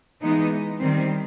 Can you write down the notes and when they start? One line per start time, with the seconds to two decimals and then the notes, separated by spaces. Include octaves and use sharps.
0.21 E3 G#3 B3 D#4
0.80 D#3 G3 C4